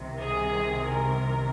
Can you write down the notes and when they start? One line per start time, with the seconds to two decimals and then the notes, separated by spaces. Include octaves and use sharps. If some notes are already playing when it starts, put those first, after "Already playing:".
Already playing: C2 C3 D#3
0.20 G#4
0.87 A#4